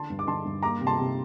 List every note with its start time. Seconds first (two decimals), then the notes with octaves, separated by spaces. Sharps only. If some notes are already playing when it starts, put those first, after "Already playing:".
Already playing: D3 A5 C6
0.10 G2
0.19 D6
0.27 D3 A5 C6
0.45 G2
0.62 A#3 A#5 D6
0.81 C3
0.87 A5 C6
0.98 C3